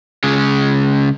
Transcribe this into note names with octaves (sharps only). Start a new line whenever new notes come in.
C#3 G#3